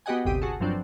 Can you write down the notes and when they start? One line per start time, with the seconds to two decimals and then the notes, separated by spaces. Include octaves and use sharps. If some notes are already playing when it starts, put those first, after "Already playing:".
0.06 B3 F#4 G4 D#5 F#5 G#5
0.25 G1 D2 C3 G4 D#6
0.42 F#4 G#4 A4
0.60 G2 F3 F#3 C4 D4